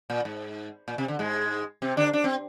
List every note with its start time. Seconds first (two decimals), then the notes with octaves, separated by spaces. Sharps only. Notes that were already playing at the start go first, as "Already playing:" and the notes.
0.10 A#2
0.25 G#2
0.88 A#2
0.98 C3
1.08 D3
1.19 G#2 G#3
1.82 C3 C4
1.97 D3 D4
2.13 D4
2.24 C4